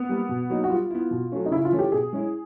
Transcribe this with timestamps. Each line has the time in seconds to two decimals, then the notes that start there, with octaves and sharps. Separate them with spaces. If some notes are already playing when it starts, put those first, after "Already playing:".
Already playing: B3
0.09 G3 A#3
0.29 B2
0.50 F#3 A#3 D#4
0.64 F#4
0.70 G3 F4
0.90 B3 E4
1.11 B2
1.32 F#3 A3 C#4
1.46 D#4
1.51 C#3 E4
1.65 F4
1.72 E3 A3 C#4
1.79 G4
1.92 B2 G#4
2.13 G#3 C#4 E4